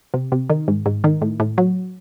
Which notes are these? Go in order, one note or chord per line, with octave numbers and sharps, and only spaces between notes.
C3
C3
D#3
G#2
G#2
D#3
A2
A2
F#3